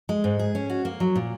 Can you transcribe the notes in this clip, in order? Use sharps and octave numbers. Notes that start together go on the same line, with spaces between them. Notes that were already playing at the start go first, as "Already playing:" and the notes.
G#3
G#2
G#4
C#4
F#4
A#3
F#3
A#2